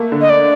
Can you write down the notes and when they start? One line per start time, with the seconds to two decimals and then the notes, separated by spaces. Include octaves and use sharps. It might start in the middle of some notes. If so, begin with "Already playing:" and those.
Already playing: A3 A#3
0.12 D3
0.21 D#5
0.29 D5